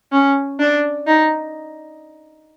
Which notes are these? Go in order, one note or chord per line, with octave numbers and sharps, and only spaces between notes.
C#4
D4
D#4